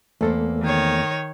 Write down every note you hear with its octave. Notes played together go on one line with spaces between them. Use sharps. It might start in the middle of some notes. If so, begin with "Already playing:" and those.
E2 A3 A#3 A4 C5
D#3 C#5